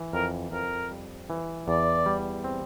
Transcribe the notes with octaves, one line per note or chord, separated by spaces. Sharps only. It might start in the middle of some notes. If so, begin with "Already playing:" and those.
Already playing: E3
F2 A#4
F2 A#4
G3
E3
E2 D5
G3
C4